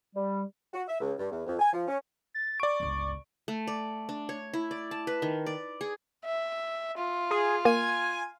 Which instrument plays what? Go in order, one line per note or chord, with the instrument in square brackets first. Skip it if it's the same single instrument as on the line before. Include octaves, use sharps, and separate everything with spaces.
[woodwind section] G3
F#4
E5
C#2
G2
E2
F2
G#5
F3
C#4
[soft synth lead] A6
[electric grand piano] D5 D7 [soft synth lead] C#6
[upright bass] G1 C#2
[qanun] A3
D5
D4
C#5
E4
D5
A5
B4
D#3
D5
G#4
[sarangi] E5
F4
[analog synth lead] G#4
[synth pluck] A#3 [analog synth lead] G#5